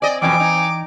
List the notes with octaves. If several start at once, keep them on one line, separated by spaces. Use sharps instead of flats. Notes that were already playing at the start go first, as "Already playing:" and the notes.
C4 D5 D#5 G#5
F2 B2 E3 G5 D6 G#6
D#4